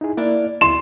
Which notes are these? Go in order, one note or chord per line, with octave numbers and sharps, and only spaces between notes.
D#4 E4 G#4
A#3 D4 E4 D5 F5
D2 D#3 A3 E4 C6 E7